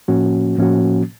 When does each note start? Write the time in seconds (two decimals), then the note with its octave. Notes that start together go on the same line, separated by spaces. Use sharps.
0.08 A2 F3 A#3 C#4 F#4
0.57 A2 F3 A#3 C#4 F#4